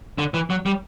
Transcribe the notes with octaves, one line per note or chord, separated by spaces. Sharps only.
D3
E3
F#3
G3